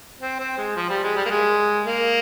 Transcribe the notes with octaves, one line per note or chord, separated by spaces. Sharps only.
C4
C4
G#3
F3
G3
G#3
G3
A#3
G#3
A#3